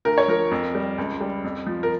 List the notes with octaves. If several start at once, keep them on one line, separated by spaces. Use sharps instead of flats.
D2 A#4
C#5
F3 A#4
F2
G3
C#2
G3
F2
F3
A#4